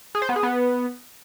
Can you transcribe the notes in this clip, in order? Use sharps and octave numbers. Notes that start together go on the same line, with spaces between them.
G#4
C5
B3
G#4
B3